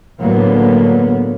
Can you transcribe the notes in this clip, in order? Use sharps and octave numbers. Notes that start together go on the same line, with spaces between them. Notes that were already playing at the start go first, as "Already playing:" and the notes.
A2 D3 F#3 A#3 B3